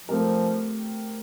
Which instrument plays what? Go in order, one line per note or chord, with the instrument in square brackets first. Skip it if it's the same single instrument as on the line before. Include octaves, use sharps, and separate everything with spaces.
[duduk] F3 [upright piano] A3 C4 G4 A#4